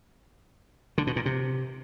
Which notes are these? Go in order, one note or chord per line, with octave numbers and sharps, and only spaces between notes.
D3
B2
A#2
C3